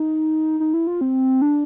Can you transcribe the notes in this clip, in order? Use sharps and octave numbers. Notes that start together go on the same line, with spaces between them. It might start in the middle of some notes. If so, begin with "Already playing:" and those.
Already playing: D#4
D#4
E4
F4
C4
D4